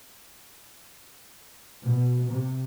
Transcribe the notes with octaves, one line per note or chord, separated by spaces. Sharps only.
B2
C3